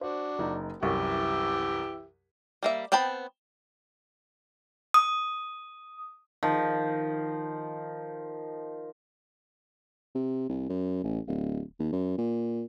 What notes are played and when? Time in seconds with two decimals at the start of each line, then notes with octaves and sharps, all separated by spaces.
0.01 D4 F#4 C5
0.39 F#1 D#4
0.83 C2 F#2 E3 G4 E5 C#6
2.63 G3 A#3 E5
2.92 B3 C4 G5 A5 B5
4.94 D#6
6.43 D#3 F3
10.15 C3
10.49 C2
10.69 F#2
11.04 A1
11.27 D1
11.79 D#2
11.92 F#2
12.18 A#2